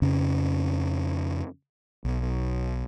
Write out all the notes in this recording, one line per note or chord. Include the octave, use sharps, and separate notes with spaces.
F2 C#3 C#4
B1